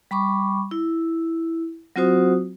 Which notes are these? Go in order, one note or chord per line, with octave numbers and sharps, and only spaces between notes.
G3 B5 C#6 D6
E4
F#3 C4 F4 F#4 C5 D#6